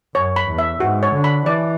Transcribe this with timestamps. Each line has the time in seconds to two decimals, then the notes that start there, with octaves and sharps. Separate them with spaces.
0.15 F#2 C#5
0.36 B5
0.48 E2
0.59 E5
0.80 G#2 F#4
1.03 C#5
1.13 D3
1.24 B5
1.45 E3 D5